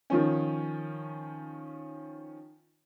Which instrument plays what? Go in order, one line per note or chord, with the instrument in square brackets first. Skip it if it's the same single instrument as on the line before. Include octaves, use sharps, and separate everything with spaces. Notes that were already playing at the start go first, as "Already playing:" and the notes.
[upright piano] D#3 F3 C#4